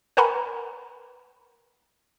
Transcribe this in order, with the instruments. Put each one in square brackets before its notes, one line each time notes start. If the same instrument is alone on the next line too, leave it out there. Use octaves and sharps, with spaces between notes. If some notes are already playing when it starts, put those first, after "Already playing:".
[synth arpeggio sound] A#4 B4 F#5 G#5 A#5 B5